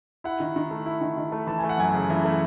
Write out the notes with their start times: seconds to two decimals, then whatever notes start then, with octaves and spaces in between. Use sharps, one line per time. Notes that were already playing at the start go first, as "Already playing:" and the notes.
0.24 E4 F#5
0.40 D#3
0.56 D#3
0.71 A3
0.86 E4
1.01 D#3
1.17 D#3
1.32 A3
1.47 E3 A5
1.59 A3 G#5
1.69 F#5
1.78 F#2 G#5
1.94 C#3
2.10 E3
2.25 A3